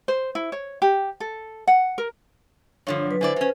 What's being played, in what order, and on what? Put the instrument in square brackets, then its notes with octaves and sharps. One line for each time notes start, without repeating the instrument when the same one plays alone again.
[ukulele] C5
E4
C#5
G4
A4
F#5
A#4
[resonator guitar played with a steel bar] G2 D3 F3 [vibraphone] C#5
[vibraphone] F#3 B4
[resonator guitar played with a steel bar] D3 E4 D5 [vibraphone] B4 C5 G#5
[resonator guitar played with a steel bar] F#3 C#4